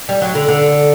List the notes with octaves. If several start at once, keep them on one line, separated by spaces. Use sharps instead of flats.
G3
F#3
D3
D3